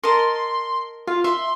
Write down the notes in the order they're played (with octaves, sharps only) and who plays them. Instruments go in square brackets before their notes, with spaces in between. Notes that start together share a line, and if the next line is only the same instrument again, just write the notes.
[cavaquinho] A#4 D#5 A5 [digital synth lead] C6
[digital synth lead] F4 [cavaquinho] F5
[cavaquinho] E5 [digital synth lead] C6